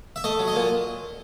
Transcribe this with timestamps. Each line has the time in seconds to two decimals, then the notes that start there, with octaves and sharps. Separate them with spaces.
0.16 E5
0.24 A3 D#5
0.39 F#3
0.48 D#5
0.55 A#2